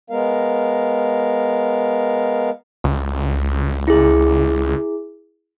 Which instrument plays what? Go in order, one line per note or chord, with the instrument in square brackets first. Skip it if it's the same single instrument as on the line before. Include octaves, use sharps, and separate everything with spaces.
[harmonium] G#3 B3 A#4 F5
[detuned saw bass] C#2
[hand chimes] E4 G#4